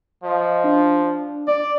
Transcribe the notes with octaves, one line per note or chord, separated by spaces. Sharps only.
F3 D#5
D4
D4
D5 D6